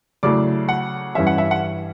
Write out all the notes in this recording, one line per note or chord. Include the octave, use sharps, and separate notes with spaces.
C#3 F#3 A3 E4 D5 D6
F#5
G2 E3 G3 C#4 E5
F#5
E5
F#5